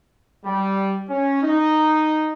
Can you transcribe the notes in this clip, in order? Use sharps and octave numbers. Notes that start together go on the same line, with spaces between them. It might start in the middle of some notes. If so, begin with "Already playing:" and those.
G3
C#4
D#4